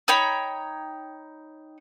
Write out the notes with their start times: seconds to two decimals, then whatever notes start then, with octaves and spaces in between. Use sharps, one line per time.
0.08 D#4 C#5 G5 B5